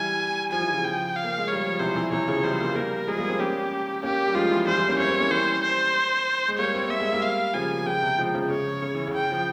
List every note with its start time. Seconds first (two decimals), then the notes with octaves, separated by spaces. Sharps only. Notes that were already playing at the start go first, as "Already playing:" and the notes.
Already playing: E3 G3 G#5
0.52 F3 G#5
0.61 E3
0.70 C#3 F3
0.84 G5
1.16 F5
1.24 A#3
1.38 G#3
1.48 G3 C#5
1.66 F3
1.80 C3 E3 C5
1.96 C3 E3
2.12 C3 E3 C#5
2.28 C#3 F3
2.44 E3 G3 C5
2.60 G3 A#3
2.75 G3 A#3 A#4
3.08 F3 G#3 G#4
3.19 G3 A#3
3.29 G#3 C4
3.39 A#3 C#4 G4
4.03 A#3 C#4 G4
4.28 G3
4.35 F3 G#3 F4
4.51 E3 G3
4.67 E3 G3 C5
4.77 E3 G3
4.88 A#3 C#4
4.99 C4 E4 C#5
5.09 C4 E4
5.20 A#3 C#4
5.31 E3 G3 C5
5.63 C5
6.48 G#3
6.59 G3 A#3 C#5
6.75 C4
6.87 A#3 E5
7.00 G#3
7.13 G3 A#3
7.22 F5
7.54 C#3 F3 G#5
7.86 C#3 G5
8.02 C3
8.18 F3 G#3
8.34 C#3 F3
8.50 C#3 C#5
8.82 C#3
8.95 E3
9.07 C#3
9.14 G5
9.32 F3